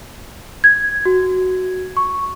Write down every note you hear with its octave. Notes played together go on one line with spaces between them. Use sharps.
G#6
F#4
C#6